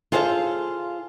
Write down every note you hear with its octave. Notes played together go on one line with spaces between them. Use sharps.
F4 G#4 A4 C5 D#5 F5